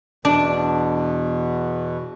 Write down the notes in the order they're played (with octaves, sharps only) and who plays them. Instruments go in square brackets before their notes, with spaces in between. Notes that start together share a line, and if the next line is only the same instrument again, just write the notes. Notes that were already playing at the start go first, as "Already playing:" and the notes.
[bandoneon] E2 B2 [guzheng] D4